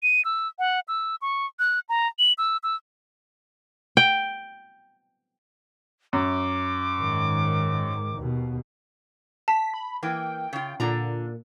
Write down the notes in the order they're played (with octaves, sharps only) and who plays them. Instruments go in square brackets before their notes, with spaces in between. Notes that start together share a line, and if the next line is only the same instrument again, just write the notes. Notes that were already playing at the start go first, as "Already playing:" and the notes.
[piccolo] D#7
E6
F#5
E6
C#6
F#6
A#5
F#7
E6
E6
[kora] G5
[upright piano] F#2 [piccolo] D6
[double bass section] G#2 D#3
D#2 B2
[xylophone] A5 [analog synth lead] B6
[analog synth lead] B5
[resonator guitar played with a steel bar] E3 A#3 [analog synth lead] G5
[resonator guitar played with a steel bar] C#3 F4
[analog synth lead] A#2 [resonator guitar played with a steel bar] D3 D4 A#5